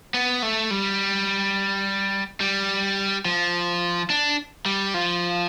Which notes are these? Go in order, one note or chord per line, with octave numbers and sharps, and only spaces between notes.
B3
A3
G3
G3
F3
D4
G3
F3